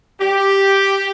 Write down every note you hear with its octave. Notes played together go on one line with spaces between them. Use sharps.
G4